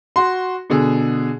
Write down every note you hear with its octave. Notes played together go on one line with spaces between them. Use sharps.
F#4 C6
B2 D3 G#4